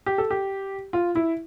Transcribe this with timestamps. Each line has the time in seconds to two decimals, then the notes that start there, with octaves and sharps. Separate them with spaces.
0.06 G4
0.18 A4
0.31 G4
0.93 F4
1.15 E4